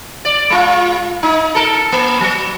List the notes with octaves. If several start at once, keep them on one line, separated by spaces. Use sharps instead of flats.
D5
G#3 F4
D#4
A4 A#4
A#3
F#3